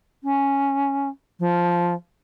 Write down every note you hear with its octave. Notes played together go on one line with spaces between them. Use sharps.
C#4
F3